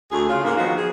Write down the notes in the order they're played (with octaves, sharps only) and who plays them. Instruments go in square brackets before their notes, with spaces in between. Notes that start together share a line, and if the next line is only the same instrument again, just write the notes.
[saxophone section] D2 G#4
C#3 F4
G#2 A#3
D#3 F3 F#3 B3 F#4
G#4